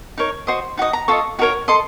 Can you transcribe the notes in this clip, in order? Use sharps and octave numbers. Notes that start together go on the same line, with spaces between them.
D#4 A#4 C#5
F#4 C5 D#5 C6
D#4 F#4 D#5
A#5
F4 A4 D#5 C#6
D#4 F#4 A#4 C#5
A4 D#5 C6